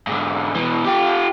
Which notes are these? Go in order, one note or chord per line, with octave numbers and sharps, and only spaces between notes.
G#2 D3
B2 E3
F4 G4